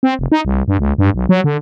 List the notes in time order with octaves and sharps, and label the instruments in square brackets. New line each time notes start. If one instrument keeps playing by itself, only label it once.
[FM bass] C4
F1
D#4
C2
G2
C#2
G2
B1
F#3
D3